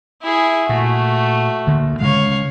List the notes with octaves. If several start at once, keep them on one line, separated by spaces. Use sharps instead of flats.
E4 G#4
A#2 A3 F#4
D2 D3 A#3
C#3 G#3 C#5 F5